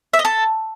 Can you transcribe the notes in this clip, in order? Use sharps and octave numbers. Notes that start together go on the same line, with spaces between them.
E5
D#5
A4